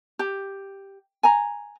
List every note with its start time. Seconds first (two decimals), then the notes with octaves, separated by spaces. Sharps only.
0.19 G4
1.23 G#5 A#5